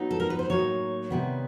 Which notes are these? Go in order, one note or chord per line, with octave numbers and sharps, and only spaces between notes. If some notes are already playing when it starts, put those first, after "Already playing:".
Already playing: F#3 B3 D#4
A4
A#4
B4
C5
A2 F#3 A#3 D#4 C#5
C3 D#3 G3 B3